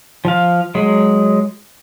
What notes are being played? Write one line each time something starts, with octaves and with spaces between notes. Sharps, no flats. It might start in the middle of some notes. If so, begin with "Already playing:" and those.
F3 F5
F#3 G#3